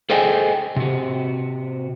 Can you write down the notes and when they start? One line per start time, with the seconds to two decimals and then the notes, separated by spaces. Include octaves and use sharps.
0.10 G#4 A4 C5 D#5 G5 G#5
0.76 C3 F#4